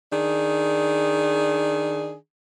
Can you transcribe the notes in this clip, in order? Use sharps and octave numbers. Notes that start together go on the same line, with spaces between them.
D#3 D4 G#4